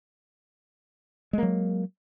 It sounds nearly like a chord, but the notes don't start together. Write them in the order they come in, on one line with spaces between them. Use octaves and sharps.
G#3 A#3 F#3